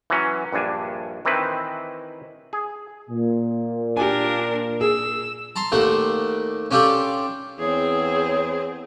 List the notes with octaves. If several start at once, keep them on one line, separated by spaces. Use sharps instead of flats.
E3 F#3 C#4
A#1 G2 D4 G#5
D#3 E3 C4 D#4 E4 B4
G#4
A#2
D4 G4 A#4 G#5
G#4 E6
A5 A#5 C6
D#2 A#2 A3 D4 F#5
C#4 D4 F4 G4 A4 D5
E2 C4 G#4 C#5